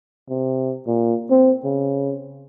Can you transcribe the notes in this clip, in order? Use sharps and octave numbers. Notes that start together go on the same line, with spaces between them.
C3
A#2
C4
C#3